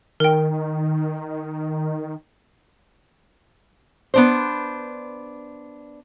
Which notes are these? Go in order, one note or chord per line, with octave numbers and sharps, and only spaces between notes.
D#3 A#4 G5
B3 D4 C5